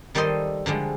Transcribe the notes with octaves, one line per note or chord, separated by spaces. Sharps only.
D#3 G3 A4 C5 D#5 C6
D3 F3 G3 G#3